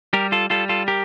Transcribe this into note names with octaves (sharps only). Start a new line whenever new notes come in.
G3 G4 A#4
F4 A4
G3 F4 A4
F4 A4
G4 A#4